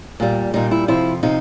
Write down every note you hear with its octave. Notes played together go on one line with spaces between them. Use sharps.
A#2 G3
A#2 G3 D#4
E4
F2 C3 F3 E4
C3 F3 D#4